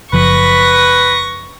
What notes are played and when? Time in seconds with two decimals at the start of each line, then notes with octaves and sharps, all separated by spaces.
0.13 F#1 F3 B4 C#6 A#6